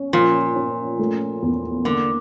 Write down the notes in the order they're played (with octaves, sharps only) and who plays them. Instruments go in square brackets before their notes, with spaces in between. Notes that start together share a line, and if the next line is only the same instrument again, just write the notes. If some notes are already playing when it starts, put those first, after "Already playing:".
Already playing: [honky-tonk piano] C#4
[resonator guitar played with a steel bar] A#2 [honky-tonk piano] F3
[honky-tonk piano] C#4
A3
E2
[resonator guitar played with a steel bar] D3 [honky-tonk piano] A#3